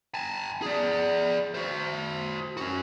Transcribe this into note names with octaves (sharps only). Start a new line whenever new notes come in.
G#5 A5
G#4 D5
F#4 C5
C#4 F#4